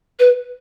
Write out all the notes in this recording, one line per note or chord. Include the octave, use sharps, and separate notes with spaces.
B4